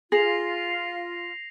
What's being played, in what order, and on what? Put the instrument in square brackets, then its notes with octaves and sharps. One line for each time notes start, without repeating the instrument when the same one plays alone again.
[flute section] F4 [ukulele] G#4 [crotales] A#6 C7 F7